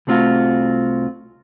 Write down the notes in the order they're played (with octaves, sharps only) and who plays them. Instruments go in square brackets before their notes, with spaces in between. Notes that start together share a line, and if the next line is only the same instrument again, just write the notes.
[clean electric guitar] C2 A3 C4 F4 F#4